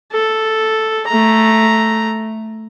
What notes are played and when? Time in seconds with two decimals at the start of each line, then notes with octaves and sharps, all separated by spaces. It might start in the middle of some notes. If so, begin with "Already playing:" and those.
0.13 A4
1.08 A3 A#5